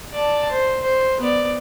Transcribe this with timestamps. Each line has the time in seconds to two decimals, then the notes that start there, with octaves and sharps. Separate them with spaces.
0.13 D5 A5
0.51 C5
0.82 C5
1.21 B3 D5